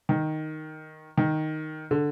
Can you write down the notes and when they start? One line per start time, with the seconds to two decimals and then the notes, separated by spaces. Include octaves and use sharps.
0.09 D#3
1.17 D#3
1.91 D3